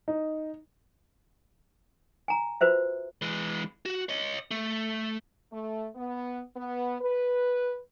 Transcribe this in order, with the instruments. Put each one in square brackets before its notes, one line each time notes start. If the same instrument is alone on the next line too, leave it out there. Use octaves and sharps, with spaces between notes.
[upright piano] D#4
[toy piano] G#5 A#5
F4 F#4 B4 C5 E5
[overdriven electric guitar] E3 G#3
F#4
C#5 D#5
A3
[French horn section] A3
B3
B3
B4